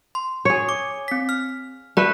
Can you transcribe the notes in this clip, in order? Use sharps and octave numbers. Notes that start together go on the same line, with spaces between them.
C6
G#4 C#5
D6
C4 B6
F6
A3 B4 D5 E5